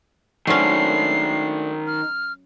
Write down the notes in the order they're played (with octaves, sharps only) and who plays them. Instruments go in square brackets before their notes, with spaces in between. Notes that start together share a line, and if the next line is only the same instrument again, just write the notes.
[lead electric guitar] D#3 C5 [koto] F#3 C#4 [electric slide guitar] A3 D4 [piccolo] C7
[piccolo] F6